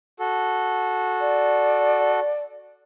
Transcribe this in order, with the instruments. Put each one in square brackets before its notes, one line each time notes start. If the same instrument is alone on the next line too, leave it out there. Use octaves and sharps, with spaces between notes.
[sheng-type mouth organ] F#4 A4
[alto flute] D5